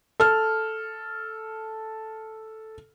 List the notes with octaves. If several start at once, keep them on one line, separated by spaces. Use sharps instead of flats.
A4 F6